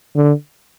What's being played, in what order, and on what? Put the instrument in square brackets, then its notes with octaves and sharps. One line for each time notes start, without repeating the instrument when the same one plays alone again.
[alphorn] D3